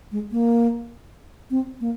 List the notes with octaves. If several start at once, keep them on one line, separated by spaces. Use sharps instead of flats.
G#3
A#3
C4
A#3